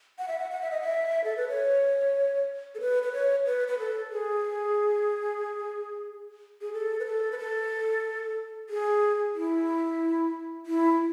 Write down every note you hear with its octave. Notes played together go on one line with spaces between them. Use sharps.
F#5
E5
F#5
F#5
E5
D#5
E5
A4
B4
C#5
A4
B4
B4
C#5
B4
B4
A4
G#4
G#4
A4
B4
A4
B4
A4
G#4
E4
E4